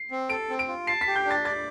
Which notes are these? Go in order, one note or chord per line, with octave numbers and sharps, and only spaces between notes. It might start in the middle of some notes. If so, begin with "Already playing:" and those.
Already playing: C7
C4
A4 D7
C4
D7
F4
A5 C7
B6
G4
G6
D4
A6
D5 A6